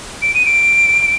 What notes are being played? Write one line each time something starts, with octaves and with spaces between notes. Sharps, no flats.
D7
D#7
D7